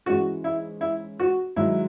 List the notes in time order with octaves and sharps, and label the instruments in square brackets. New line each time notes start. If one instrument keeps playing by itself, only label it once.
[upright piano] G#2 E3 G#3 C#4 G#4 [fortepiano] F#4
[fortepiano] E4
E4
F#4
[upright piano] G#2 D#3 F#3 [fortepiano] E4